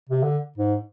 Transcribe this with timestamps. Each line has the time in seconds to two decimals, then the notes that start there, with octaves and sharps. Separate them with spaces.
0.09 C3
0.23 D3
0.58 G#2